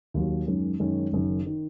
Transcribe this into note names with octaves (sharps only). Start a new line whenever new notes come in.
D#2 D#3 F#3
F#2 D#3 G#3 C#4
F#2 D#3 G#3 C#4
F#1 F#2 D#3
D#3